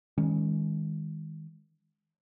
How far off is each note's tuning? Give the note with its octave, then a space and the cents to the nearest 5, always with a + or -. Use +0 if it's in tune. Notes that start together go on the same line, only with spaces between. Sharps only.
D#3 +25 G#3 -20 C#4 +0